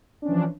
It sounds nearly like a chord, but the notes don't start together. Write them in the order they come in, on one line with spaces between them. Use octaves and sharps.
D4 C#4 E3 F3